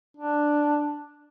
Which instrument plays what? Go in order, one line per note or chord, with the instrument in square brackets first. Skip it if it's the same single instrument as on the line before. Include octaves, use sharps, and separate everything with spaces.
[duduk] D4